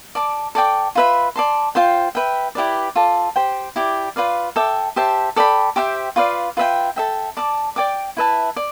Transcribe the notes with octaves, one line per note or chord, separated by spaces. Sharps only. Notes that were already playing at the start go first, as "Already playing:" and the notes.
D5 A5 D6
A4 D5 G5 D6
F4 B4 E5 B5
D5 A5 C6
F4 C5 G5
B4 E5 G5
E4 G4 B4 D5
F4 A4 D5 A5
G4 C5 G5
E4 G4 D5
F4 B4 D5 F5
A4 E5 G5 D6
G4 C5 E5 A5
A4 D5 G5 B5
G4 C5 E5 G5
F4 B4 D5 F5
F4 B4 E5 G5
A4 E5 G5
D5 A5 D6
D5 G5 D6
E4 B4 E5 A5
D5